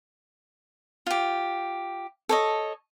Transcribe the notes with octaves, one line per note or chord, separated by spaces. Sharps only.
F4 G4
A4 C#5 D#5